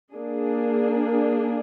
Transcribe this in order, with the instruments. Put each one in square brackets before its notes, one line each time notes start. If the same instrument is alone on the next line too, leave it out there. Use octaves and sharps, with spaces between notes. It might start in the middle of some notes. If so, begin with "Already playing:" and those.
[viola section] A#3 D4 G#4